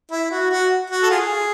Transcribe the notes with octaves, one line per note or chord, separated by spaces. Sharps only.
E4
F#4
F#4
F#4
A4
F4 G#4